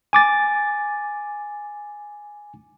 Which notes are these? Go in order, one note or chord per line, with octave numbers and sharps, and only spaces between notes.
G#5 D6 A6